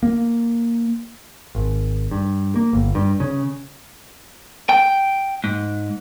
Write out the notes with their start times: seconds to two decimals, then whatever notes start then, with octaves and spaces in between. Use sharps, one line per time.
0.03 A#3
1.55 G#1
2.11 G2
2.56 A#3
2.73 G1
2.95 G2
3.20 C#3
4.69 G5
5.44 G#2